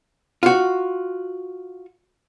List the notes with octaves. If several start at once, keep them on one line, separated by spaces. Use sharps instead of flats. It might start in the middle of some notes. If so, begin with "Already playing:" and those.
F4 F#4